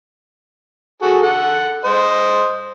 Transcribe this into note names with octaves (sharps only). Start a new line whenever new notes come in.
F#4 G#4 A4
A4 F#5
C5 D#5